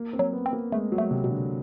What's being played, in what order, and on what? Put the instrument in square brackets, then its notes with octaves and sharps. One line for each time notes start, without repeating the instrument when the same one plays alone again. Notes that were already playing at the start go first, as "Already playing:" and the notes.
Already playing: [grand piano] A#3
C4
[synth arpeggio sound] F#3
[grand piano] B3
[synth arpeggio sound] C4
[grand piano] A#3
[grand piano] G#3 [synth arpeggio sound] A3
[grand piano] F#3
[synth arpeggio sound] A3
[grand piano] C3
[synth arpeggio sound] B2
[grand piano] D3